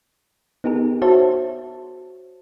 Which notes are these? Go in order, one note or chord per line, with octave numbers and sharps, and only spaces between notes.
B3 D#4 G4 G#4 A#4
F#4 C5 C#5 E5 A5